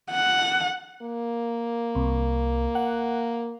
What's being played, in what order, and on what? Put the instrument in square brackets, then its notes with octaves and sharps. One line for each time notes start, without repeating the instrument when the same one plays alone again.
[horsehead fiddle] F#5
[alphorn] A#3
[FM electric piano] C2
F#5